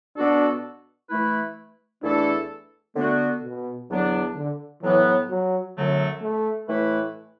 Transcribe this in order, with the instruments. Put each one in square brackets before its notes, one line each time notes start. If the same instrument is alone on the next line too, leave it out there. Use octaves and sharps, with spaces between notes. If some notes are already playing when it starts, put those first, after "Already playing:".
[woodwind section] B2 B3 F#4 A4 [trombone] D4
[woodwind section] E3 A3 E4 B4
[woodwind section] E2 E3 A3 E4 A4 [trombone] D4
[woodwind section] D3 B3 F#4 [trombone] A3
[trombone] B2
[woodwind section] E2 D3 F#3 B3 D4
[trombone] D3
[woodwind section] A2 F#3 B3 [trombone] E3
[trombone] F#3
[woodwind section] F#2 D3 F#3 A3
[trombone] A3
[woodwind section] A2 E3 A3 E4 B4